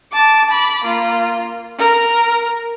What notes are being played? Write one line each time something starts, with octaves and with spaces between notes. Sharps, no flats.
A5 D6
B5 D6
A#3 F4
A#4